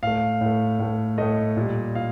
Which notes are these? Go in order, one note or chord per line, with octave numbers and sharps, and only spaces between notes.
A2 A3 F5
A2 A3
A2 A3
A2 A3 D#5
A#2 G3
A#2 F5